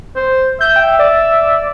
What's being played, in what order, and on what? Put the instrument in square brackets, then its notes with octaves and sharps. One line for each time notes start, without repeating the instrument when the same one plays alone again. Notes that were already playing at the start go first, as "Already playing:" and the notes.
[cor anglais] C5
[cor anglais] E5 [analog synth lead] G6
[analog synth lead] G5
D5